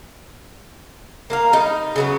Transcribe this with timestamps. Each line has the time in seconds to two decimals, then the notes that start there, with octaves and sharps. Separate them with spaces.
1.30 A#3 A#4 F5
1.53 G3 D#4
1.96 C#3 F#3 B3